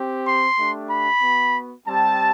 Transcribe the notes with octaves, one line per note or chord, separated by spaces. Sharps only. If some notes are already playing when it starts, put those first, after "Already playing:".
Already playing: C4 G4
C6
A3 D4 G4
B5
B3 F#4
G3 C4 G4 A5